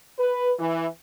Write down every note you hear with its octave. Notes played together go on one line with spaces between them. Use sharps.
B4
E3